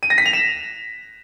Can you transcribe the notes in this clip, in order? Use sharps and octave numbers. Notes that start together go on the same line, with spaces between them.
D#7
A#6
B6
F7
E7